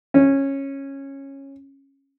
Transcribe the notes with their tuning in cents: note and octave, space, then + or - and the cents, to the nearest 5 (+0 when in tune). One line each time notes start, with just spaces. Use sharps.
C#4 -15